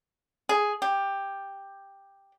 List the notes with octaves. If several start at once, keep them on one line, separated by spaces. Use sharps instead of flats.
G#4
G4